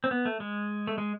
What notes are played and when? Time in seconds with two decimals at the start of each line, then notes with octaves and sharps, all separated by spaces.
0.04 C4
0.11 B3
0.25 A3
0.40 G#3
0.87 A3
0.98 G#3